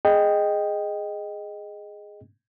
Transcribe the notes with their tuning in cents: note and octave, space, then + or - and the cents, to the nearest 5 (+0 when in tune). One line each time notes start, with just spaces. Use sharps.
G#4 +0 D#5 -5 G5 +0